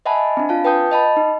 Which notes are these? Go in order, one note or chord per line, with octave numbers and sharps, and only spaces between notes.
D#5 E5 F#5 G#5 A5 B5
C4 D4
F4 F5 A5
B4 G5 A5 D#6 G6
D#5 A5 B5
D#4